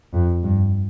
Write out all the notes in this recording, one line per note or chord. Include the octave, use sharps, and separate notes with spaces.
F2
G2